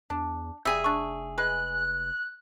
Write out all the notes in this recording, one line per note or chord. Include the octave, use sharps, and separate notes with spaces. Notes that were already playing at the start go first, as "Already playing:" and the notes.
E2 D4
F1 G3 G#4 E5
D4 C#6
G#3 B4 F#6